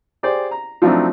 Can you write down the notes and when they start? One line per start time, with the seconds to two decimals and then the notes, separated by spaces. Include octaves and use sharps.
0.23 G4 G#4 C5 D5
0.51 A#5
0.82 F3 F#3 A3 C4 D4 D#4